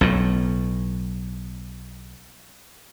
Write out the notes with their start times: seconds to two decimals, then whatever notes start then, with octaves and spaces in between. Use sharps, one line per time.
0.01 B1 A2